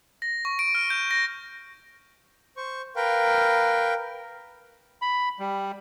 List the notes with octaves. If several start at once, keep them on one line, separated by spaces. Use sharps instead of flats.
A#6
C#6
D7
F6
G6
A#6
C5 C#6
A#4 B4 F5 G5
B5
G3